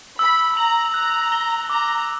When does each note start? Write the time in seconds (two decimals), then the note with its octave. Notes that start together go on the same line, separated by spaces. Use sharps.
0.19 B5 E6
0.57 A#5 F#7
0.94 A#5 F#6
1.32 G7
1.70 A#5 D6